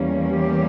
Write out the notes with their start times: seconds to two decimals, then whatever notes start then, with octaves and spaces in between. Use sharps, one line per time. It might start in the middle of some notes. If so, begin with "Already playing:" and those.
Already playing: E2 E3 G3 A#3 C#4
0.28 G4